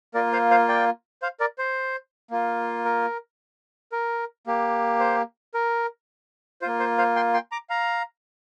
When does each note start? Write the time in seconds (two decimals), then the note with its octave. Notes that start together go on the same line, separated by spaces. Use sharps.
0.14 A#3 F4 A#4 D5
0.32 C5 F5
0.51 C5 F5
0.68 D5 G5
1.22 C5 F5
1.40 A#4 D5
1.58 C5
2.31 A#3 F4
2.85 A#4
3.92 A#4
4.47 A#3 G4
5.00 C5
5.54 A#4
6.62 A#3 F4 C5
6.80 C5
6.98 C5 F5
7.16 G5 C6
7.34 G5 C6
7.52 A#5 D6
7.70 F5 A#5